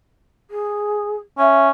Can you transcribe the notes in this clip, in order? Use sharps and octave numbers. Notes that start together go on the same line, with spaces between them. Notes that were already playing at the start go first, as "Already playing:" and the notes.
G#4
C#4 E5